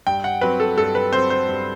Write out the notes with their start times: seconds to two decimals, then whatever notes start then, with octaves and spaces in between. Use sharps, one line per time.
0.07 G2 G5
0.24 F#5
0.41 F#3 C4 B4
0.60 A4
0.77 G2 A4
0.95 B4
1.12 F#3 C4 C5
1.30 C5
1.48 G2